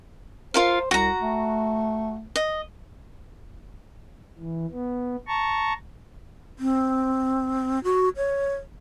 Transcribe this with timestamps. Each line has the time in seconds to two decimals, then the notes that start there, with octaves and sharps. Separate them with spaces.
0.54 F4 A#4 C5 F5
0.91 C2 F#4 A#5
1.20 A3
2.36 D#5
4.38 E3
4.72 B3
5.27 A5 A#5 C#6
6.59 C4
7.84 F#4
8.17 C#5